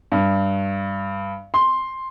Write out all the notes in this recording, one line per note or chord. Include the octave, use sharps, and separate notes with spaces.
G2
C6